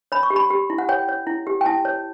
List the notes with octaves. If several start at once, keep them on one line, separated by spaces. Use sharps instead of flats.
C#5 B5
C#6
G4
B5
G4
E4
F#5
C#5 G5
C#5
E4
G4
G5
E4 A5
C#5